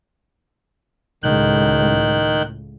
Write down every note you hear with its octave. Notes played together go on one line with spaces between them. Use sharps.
C#2 A2 D#3 F#6 G6